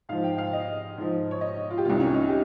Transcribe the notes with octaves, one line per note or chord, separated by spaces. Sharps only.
G#2 F3 F5
G5
F5
D#5
G#2 F3
C#5
D#5
F4
G4
C2 C3 D#3 F4
C#4
D#4
G4